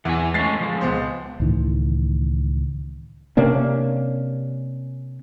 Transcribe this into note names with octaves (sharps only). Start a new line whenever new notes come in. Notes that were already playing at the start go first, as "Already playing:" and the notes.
E2 E3 G#5
G#3 A3 C#4 A6 B6 C7
F3 G#3
C#2 B3 C5
C#2 A2 D#3 E3
C3 A#3 C#4 D4